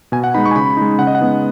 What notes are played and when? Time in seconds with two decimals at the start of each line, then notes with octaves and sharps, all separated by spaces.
0.12 B2 G#5
0.24 F#5
0.34 G#3 B3 D#4 B5
0.45 C#6
0.51 G#5
0.56 C#3 B5
0.77 G#3 D#4
0.99 C#3 F#5
1.07 D#5
1.15 F#5
1.21 G#3 B3 D#4